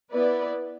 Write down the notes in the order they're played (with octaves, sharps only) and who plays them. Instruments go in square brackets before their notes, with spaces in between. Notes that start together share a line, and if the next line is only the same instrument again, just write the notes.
[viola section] B3 E4 B4 D5